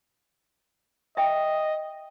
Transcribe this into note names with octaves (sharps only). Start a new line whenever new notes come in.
D#5 E5 G5